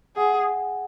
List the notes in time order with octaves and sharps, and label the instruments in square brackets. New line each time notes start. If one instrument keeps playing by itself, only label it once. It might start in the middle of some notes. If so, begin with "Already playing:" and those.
[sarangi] G#4 [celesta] F#5